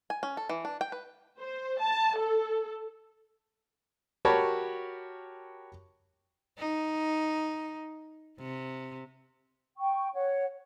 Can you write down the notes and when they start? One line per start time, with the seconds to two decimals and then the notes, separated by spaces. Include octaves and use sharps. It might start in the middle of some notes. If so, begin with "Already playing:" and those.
0.10 G#5
0.23 C#4
0.37 A4
0.49 E3
0.65 D4
0.81 G5
0.92 B4
1.41 C5
1.81 A5
2.17 A4
4.25 F#4 G4 A#4 C#5 A5 B5
6.59 D#4
8.38 C3
9.78 G5 C#6
10.14 C#5 F#5